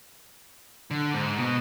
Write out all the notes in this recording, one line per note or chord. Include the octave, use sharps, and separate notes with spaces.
D3
G#2
B2